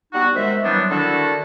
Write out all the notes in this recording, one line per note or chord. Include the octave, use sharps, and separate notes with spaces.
G3 B3 D#4 F#4
D#2 G#3 C5 E5
E3 F#3 G3 B3 C4 D4
D3 D#3 D4 E4 F#4 A4